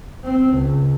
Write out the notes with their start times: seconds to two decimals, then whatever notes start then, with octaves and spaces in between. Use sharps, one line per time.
0.25 C4
0.54 C#2